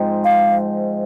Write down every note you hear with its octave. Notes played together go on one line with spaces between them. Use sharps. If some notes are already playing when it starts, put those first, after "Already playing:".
Already playing: G#2 F3 C4 D#4
F5